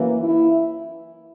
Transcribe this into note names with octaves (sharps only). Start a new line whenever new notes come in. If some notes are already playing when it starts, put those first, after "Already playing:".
Already playing: F#2 E3 A#3
E4